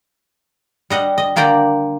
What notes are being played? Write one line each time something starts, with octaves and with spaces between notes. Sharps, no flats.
G3 D#5 F#5
D#5
D3 A#3 D5 G5 A#5